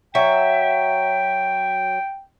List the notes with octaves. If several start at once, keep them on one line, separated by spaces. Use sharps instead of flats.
F#3 E5 G5